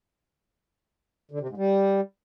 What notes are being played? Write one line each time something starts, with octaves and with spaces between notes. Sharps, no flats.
D3
C3
G#2
G3